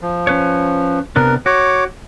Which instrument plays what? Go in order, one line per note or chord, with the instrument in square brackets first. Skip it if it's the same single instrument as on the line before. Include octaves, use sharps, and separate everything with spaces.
[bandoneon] F3
[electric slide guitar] C#4 B4 C#5
[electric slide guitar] C3 B3 D4 [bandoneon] A#4
[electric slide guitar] F#4 [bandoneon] C#5 D6